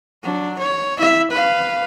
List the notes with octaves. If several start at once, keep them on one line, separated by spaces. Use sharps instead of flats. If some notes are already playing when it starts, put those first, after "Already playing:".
F#3 D4
C#5
E4 E5
B4 F5